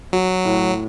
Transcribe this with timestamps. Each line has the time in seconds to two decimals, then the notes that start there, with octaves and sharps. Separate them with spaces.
0.13 F#3 F#4
0.45 A2